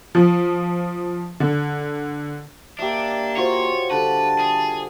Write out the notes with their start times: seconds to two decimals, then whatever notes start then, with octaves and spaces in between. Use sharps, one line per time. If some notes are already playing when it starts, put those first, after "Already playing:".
0.15 F3
1.40 D3
2.79 A#3 D4 G4 E5
3.37 F4 F#4 C5 C#5
3.91 D3 G3 B4 A5
4.39 G#4